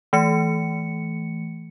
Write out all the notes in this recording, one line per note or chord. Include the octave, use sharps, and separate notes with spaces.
E3 A3 C#7